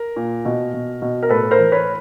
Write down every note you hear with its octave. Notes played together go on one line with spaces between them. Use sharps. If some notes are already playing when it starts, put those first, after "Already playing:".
Already playing: A#4
A#2
B2
B2
B2
A#4
A2 A4 B4
A#4 C5
E3
B4 C#5